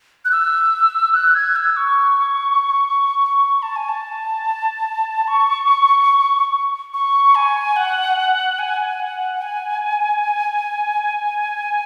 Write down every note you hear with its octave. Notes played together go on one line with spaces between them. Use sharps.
F#6
E6
F#6
G#6
E6
C#6
A5
G#5
A5
C#6
C#6
G#5
F#5
G#5
F#5
G#5